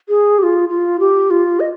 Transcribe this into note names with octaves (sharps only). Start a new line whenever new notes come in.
G#4
G4
F4
F4
G4
F4
D#5